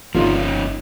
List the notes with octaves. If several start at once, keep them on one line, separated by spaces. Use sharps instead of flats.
G1 F3 A#3 C#4 D#4 F4